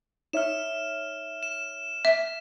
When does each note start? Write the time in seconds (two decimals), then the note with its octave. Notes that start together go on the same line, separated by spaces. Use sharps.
0.33 D#4 C#5 E5 F6 E7
1.43 E7
2.05 E5